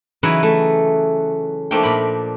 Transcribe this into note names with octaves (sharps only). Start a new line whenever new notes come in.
C#3 E3 F#3 D#4 B4
A3
F3 A3 A#3 D4 D#4 G5
A#2 B5